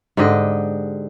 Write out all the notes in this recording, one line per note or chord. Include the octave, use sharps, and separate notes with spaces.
G#2 D3 G4 D#5